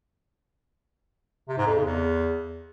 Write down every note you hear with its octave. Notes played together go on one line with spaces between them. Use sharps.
C3
G#2
F2
C#3
E2